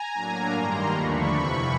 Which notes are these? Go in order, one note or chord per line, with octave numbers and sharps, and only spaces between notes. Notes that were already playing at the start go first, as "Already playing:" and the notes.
Already playing: G#5 A#5
A2 F#3 A#3 D4
G2 D#3 G3 A#3 A#5 C6
D#2 D3 F3 A3 D4 B5 C#6
F2 C3 E3